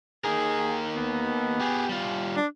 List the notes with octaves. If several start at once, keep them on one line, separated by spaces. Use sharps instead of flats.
A#3 D#4 G#4 A#4
B3
G4 G#4
G3 F4
D4